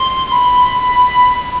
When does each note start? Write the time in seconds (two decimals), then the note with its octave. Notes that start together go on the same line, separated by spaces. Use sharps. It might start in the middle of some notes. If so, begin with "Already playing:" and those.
Already playing: C6
0.31 B5